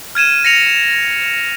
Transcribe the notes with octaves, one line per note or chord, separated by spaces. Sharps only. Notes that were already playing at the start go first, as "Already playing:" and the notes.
F6 G#6 D#7 E7
A#6 C#7 F7